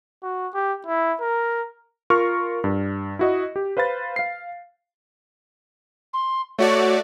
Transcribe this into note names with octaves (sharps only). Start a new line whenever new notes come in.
F#4
G4
E4
A#4
F4 A#4 C#6 F6
G2
E4 F#4 D#5
G4
B4 C5 F5 B5 A6
F5 C7
C6
A3 F#4 C#5 D5